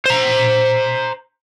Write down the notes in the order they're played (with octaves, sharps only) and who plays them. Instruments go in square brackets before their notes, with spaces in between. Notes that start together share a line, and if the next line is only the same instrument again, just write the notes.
[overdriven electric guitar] C5 A#5